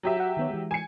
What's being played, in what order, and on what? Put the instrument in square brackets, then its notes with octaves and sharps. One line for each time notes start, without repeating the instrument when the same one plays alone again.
[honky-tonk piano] F#3 G4 E5
[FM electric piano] F#4 F#5
D#3 B3 C#5
E3 G#3
[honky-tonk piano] G#5 C#7